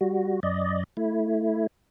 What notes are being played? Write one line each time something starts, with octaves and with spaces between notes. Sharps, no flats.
G3 F#4
F#2 D5 D#5
A3 E4